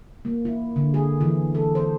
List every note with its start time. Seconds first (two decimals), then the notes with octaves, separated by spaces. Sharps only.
0.25 A#3
0.45 E4
0.76 D3
0.94 G#4
1.21 E3
1.55 A4
1.75 C5